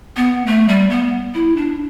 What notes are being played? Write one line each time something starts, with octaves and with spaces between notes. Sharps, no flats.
B3
A3
G3
B3
E4
D4